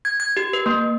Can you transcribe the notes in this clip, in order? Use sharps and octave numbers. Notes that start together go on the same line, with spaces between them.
G#6
G#6
G4
B4
A#3